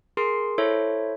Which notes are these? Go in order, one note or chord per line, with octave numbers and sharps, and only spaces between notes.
G#4 A#4 C6 C7
E4 A4 C5 C#5 E5